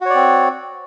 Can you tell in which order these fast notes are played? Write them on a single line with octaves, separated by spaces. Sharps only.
F#4 C#5 D5 C4